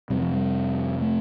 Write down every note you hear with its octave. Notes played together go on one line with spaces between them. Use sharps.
F2 C3 G3
F3
G3
A3